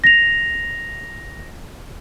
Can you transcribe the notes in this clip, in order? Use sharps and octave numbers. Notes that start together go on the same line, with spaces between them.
A#6 F7